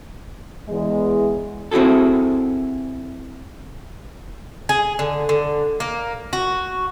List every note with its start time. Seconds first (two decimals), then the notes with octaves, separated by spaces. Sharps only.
0.69 E2 G#3
1.71 C4 E4 F#4 G#4 A4
4.69 G#4
4.99 D3
5.29 D3
5.80 A#3
6.33 F#4